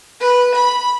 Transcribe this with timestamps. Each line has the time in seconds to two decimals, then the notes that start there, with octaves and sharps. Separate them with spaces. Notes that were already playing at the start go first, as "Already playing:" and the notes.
0.20 B4
0.55 B5